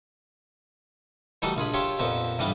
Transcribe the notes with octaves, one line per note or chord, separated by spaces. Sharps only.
E3 G3 A3 D#4 F#4 A4
A#1 F4 G#4 B5
F4 G4 C#5 E5 A5 C6
F2 A#2 B3 C5 E5
B1 G2 E3 G3 B3 F5